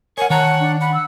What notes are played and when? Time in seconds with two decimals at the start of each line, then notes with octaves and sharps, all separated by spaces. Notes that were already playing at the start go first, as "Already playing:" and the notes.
0.18 A#4 C#5 F#5 G#5
0.30 D#3 C#5 F#5 A5 A#5
0.60 D4
0.81 F#5 B5
0.94 E6